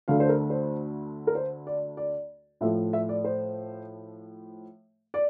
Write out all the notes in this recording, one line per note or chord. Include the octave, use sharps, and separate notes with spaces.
D2 D3 A3 F5
C5
A#4
C5
A#4
C5
D5
D5
A2 F3 A3 E5
E5
D5
C5
D5